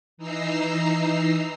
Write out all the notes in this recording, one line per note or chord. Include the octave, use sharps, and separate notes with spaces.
E3 D#4 A#5 E6 C7